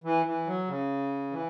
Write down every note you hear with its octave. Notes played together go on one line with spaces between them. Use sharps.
E3
E3
F#3
C#3
E3